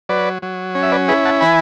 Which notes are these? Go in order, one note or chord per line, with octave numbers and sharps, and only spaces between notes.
F#3 B4 D5
F#3
C#4
E5
B4 D5
E4 G#4 B4
F#5 A5
E3 G#5 B5